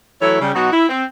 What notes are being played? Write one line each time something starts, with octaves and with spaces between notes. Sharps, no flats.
E3 F#3 A3 E4 A4 C#5
C#3 G3
B2 F#3 D#4 F#4
E4
C4